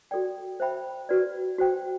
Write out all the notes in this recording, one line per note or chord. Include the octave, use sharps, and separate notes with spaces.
F#4 A4 D5 G5
C5 E5 G5 B5
F#4 B4 D5
F#4 C5 G5